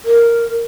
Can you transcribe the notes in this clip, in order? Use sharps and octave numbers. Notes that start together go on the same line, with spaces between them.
A#4